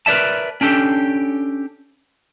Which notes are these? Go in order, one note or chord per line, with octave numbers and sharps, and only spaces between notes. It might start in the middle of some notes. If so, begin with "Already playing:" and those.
A#4 B4 C#5 D5 E5 A5
C#4 D4 G4 A4